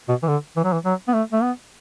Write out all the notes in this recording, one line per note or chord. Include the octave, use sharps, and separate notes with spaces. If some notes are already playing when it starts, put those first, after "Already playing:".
B2
E3
D3
E3
F#3
E3
F#3
B3
A3
A3
B3